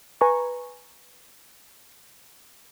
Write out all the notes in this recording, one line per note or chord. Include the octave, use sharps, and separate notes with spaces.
B4 G#5 A#5 C#6